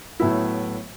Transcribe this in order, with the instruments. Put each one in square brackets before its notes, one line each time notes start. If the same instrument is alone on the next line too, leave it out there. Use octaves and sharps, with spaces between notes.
[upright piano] A2 F#3 B3 E4